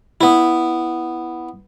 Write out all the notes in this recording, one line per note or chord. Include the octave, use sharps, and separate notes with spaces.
B3 E4